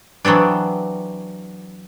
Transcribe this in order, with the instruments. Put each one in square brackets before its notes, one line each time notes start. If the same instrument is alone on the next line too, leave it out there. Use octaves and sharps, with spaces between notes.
[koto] E3 F#3 B3 C4 D4